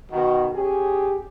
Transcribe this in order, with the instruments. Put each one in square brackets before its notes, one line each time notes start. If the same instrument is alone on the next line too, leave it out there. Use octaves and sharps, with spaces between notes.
[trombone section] B2 D#3 [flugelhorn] F#4
[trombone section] C#4 G#4 [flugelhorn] G4